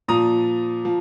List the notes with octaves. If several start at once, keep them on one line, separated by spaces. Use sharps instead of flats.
A#2 F3 A#5 D#6
F3